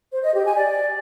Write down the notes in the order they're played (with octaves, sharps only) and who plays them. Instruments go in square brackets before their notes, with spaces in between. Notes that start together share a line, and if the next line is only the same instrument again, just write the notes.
[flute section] C5
D#5
G4
G#5
D5